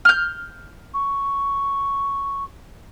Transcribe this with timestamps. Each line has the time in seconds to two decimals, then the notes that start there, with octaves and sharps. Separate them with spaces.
0.05 F6 G6
0.94 C#6